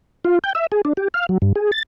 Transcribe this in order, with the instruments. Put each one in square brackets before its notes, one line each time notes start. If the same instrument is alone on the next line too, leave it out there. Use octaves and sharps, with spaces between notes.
[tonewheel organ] F4
G5
E5
G#4
D4
G4
F5
F#3
G2
G#4
A6